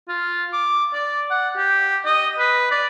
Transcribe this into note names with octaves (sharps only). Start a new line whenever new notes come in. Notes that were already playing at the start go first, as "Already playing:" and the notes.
F4
D6
D5
F#5
G4
D#5
B4
D5